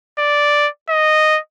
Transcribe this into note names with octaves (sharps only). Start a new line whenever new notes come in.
D5
D#5